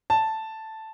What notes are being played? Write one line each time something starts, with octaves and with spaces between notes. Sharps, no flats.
A5